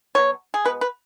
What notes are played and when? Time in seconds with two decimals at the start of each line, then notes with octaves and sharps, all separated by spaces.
0.15 B2 F#3 B3 C#5
0.54 G#4
0.65 B2 G#3 B3 B4
0.81 B4